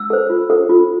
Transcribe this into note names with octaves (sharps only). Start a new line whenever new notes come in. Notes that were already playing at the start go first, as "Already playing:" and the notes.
Already playing: E6
A4 C5
F4
A4 C5
F4